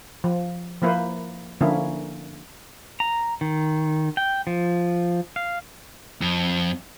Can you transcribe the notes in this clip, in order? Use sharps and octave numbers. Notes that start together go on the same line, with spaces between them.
F3
F3 A#3 E4 B4 C5
D3 F3 A#3 C#4 E4
A#5
D#3
G5
F3
F5
F2